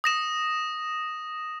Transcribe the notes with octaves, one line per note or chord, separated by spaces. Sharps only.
D#6 A#6 E7